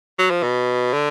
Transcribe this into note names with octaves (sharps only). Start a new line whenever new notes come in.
F#3
F3
B2
D3